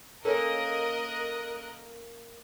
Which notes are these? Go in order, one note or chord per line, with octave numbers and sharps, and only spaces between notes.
A#3 C#4 A4 A#4 D#5 F#6